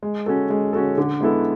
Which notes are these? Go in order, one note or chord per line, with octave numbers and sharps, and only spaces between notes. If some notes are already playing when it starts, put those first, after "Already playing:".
G#3
C#4 F#4 A4
G#3
C#4 F#4 A4
D3
G#3 B3 E4 A4